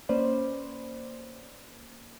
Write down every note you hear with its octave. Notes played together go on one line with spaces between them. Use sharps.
A#3 C#4 B4 C5 D5